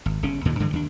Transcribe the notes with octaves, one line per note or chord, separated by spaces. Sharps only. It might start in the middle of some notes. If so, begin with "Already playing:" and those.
G#1
G1 C#3 C#4
D#2 A#2 D3 D#3
G2 D3 E3 G#3
D#2 D4